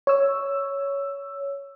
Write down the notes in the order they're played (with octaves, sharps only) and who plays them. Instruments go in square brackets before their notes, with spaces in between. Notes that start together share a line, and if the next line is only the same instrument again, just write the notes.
[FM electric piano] C#5 E6